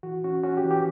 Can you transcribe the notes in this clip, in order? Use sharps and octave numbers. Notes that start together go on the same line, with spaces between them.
E3 F#4
C#4 F#4
C#4 F#4
G4
E3
G4